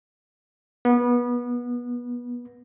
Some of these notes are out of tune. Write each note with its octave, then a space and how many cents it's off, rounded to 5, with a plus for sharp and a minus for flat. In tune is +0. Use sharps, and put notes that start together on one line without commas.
B3 -25